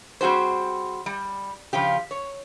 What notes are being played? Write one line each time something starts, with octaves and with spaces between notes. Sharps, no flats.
G3 C4 F#4 G#4 C5
G3
C#3 F3 F4 G4
C#5